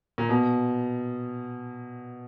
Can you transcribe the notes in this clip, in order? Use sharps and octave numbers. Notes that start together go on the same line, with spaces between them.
A#2
B2